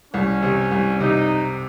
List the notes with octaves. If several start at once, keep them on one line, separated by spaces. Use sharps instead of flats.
C2 C#4
C3
C2
C3 D#4